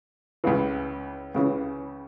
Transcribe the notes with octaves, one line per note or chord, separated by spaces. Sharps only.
C#2 C#3 E3
C#2 C#3 E3